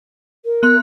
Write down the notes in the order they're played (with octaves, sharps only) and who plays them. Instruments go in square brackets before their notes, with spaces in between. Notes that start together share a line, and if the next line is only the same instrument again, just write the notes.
[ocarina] A#4
[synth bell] B3 C6 [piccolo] F#6